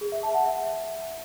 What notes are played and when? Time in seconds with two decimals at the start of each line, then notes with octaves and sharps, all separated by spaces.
0.01 G#4
0.12 E5
0.23 A5
0.34 F#5
0.45 E5